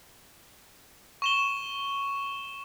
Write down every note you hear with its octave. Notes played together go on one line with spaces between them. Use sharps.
C#6 E7 G7